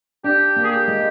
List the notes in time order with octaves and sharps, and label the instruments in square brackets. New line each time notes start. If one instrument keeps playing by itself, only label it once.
[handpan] D4 [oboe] G4
[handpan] A#3
[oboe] G#4
G4
[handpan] G#3